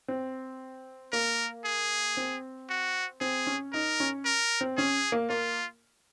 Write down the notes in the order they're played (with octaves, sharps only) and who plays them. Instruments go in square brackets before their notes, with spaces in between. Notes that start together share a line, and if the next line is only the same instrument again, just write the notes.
[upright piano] C4
[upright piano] A#3 [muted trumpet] A#4
[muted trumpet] G#4
[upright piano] C4
[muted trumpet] F#4
[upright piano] C4 [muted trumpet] G#4
[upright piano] C#4
[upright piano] D#4 [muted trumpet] A#4
[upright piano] C#4
[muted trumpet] A#4
[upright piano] C4
[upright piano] C#4 [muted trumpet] G#4
[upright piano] A#3
[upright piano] A#3 [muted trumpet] F4